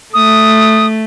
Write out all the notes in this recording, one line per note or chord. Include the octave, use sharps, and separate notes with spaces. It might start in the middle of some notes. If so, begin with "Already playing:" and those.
A3 D#6